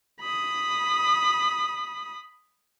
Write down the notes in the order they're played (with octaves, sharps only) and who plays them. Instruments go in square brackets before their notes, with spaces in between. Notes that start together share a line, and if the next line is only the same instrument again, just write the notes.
[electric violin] B5 D#6